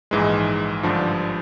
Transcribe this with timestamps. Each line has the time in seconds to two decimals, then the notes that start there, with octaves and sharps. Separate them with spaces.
0.11 A#1 G#2 E3 G#3
0.83 G#1 G2 D3 F3